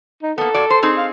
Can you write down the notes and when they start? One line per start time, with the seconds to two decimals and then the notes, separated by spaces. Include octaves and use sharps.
0.22 D#4
0.38 A#3 B3 A4
0.54 A#2 F#4 D5
0.70 C5
0.82 C4 D#4 G#4
0.97 F5